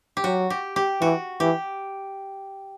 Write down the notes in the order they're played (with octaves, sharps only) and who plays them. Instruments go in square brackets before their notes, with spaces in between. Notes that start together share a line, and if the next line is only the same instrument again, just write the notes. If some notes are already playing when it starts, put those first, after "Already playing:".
[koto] G4
[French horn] F#3 [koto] F#4
[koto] G4
G4
[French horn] E3 [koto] F#4
[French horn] E3 [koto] G4